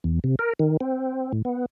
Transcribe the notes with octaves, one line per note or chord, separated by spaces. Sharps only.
E2
C3
A#4
D#3
C4
A2
B3